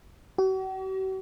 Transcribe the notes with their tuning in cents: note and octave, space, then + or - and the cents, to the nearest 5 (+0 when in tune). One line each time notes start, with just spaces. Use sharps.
F#4 +45